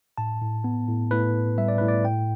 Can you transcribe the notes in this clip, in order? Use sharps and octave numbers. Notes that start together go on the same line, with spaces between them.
A2 A5
A2
B3
A2
A2 B4
A2
G3 E5
D5
A2 B4
D5
A2 G5